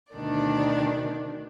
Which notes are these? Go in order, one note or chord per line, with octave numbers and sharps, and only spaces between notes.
D2 B2 D#3 D4 D5